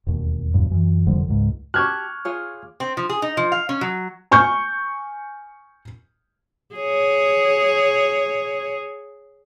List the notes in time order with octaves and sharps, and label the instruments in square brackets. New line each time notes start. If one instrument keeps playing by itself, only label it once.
[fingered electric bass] E1 D#2
B1 E2 G2
F#2 E3
F1 D3 F3 G3
C#2 G#2
[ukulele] G4 A5 [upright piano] C#6 D6 F6 [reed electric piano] F#6 G#6
[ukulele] F4 G#4 C#5
[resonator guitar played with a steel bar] C4
F3
G#4
D#4
F3
F5
C#4
F#3
[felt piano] G#5 C#6 F6 G6
[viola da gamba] G#4 C#5